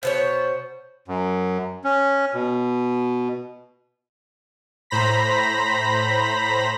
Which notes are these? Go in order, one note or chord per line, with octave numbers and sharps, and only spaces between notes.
B2 B3 C5 C#5
F#2
C#4
B2
A2 C5 A#5 B5 A#6 B6